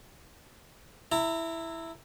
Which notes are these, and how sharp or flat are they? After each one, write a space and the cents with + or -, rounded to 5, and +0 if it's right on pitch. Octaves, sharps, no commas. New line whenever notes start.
E4 +0 A#5 -30